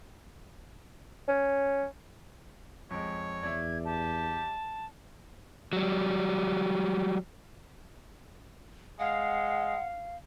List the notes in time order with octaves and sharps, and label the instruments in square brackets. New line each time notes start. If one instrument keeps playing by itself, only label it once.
[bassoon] C#4
[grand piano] F2 G#3 [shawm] C#5
[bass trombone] E2 [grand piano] D5 E5 [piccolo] G#6
[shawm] G4 [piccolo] A5
[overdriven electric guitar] F#3 G3
[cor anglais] G#3 [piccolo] F5 [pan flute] F#5